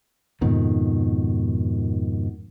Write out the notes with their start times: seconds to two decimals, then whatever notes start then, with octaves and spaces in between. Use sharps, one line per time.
0.41 F2 G#2 B2 D#3